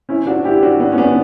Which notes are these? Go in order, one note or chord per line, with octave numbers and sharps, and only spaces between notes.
C#4 E4
D4 F#4
E4 G4
D4 F#4
B3 D4
C#4
B3 D4